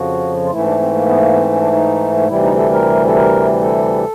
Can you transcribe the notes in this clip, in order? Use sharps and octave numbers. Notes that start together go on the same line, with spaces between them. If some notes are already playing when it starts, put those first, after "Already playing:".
Already playing: F2 C#3 F3 F#4
F4
G#2 E3 A3 E4
C#4
D4
C4
A#3
B3
A#3
B3
C4
C#4
D4
D#4
D2 C3 E3 G3 E4
D#4
A4
A#4
A4
A#4
A4